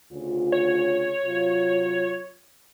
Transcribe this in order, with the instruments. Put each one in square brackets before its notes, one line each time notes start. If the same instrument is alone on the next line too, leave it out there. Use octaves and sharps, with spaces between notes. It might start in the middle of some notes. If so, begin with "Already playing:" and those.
[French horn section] D2 C#3 F4
[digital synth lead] C#5
[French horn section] C3 F#3 F4